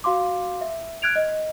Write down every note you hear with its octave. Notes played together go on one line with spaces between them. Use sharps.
F#4 F5 C6 D6
E5
F6 F#6 G#6 D7 F7
D#5